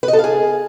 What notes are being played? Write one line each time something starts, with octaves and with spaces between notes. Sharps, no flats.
B4
D#5
A4
F5
G#4